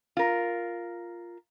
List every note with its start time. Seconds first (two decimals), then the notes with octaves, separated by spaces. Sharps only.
0.17 F4 A#4